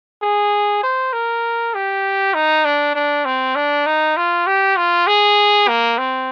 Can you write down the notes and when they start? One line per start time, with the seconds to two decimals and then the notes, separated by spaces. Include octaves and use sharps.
0.22 G#4
0.83 C5
1.13 A#4
1.75 G4
2.34 D#4
2.65 D4
2.95 D4
3.25 C4
3.55 D4
3.86 D#4
4.17 F4
4.47 G4
4.77 F4
5.07 G#4
5.68 A#3
5.98 C4